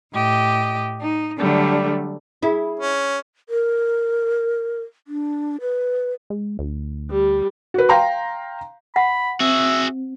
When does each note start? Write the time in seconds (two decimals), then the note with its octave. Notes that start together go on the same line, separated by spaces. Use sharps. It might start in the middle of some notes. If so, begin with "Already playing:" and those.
0.12 A2 G4 D#5
1.01 D#4
1.37 D3 F#3 G3 A3 D4
2.43 E4 G#4
2.80 C#4
3.49 A#4
5.08 D4
5.61 B4
6.30 G#3
6.59 D2
7.10 G3
7.74 F#4 B4
7.89 F5 G5 A#5 C6
8.96 F#5 B5
9.40 C4 F#4 G#4 E5